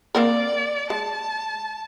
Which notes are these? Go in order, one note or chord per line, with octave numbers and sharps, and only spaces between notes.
A#3 C4 A#4 D5
G#3 A5